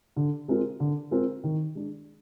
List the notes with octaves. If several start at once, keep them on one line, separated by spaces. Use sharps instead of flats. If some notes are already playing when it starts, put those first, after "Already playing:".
D3
G#3 C4 F4 A#4
D3
G#3 C4 F4 A#4
D#3
G#3 D4